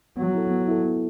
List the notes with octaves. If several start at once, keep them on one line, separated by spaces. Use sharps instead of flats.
F#3 B3
E4 A4
B3
E4 A4
B3